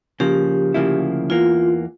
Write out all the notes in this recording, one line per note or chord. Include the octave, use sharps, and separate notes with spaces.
C#3 F3 A#3 G4
D2 C#3 F3 A#3 E4
E2 E3 A#3 F4